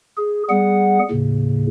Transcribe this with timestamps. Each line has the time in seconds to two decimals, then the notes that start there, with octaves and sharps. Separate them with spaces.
0.17 G#4
0.49 G3 B3 G#4 F#5
1.11 D#2 A2 C#3